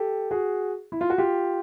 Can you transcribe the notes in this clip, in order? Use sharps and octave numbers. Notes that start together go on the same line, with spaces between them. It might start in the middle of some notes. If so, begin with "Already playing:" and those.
Already playing: G4 A4
F#4 G#4
E4
F4
F#4
F4 G4